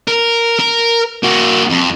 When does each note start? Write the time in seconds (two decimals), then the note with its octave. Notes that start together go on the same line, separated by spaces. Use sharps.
0.08 A#4
0.59 A#4
1.23 A#3 F#4
1.69 F2